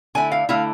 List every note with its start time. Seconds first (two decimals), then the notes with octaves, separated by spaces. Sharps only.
0.15 D3 A3 E4 G#5
0.32 F5
0.49 D3 A3 E4 F5